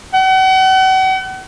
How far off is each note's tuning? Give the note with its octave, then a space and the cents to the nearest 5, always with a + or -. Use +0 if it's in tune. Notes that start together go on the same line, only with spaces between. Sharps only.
F#5 +40